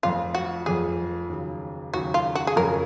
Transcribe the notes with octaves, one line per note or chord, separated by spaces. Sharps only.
F1 F2 F3 F4
F#4
F1 F2 F3 G#4
D#2 C#3 F#3
D#2 C#3 F#3 F#4
F4
F#4
G#4
F2 C#3 F#3 C#4 A#4